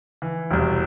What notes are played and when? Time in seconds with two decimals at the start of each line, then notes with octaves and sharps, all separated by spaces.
0.22 E3
0.50 E1 C2